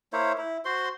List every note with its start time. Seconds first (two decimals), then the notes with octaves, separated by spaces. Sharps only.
0.13 A#3 E4 C5 C#5
0.38 E4
0.65 F#4 C5 C6